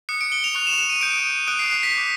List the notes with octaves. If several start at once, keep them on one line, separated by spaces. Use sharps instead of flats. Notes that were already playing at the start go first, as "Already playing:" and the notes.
D#6 F#6 C#7
D7
G7
F7
C#6 F#6 F7
E7
E7
D#7
D#6 G6 D7
D#6 F#6 D7
C7
C7
B6
D6 G6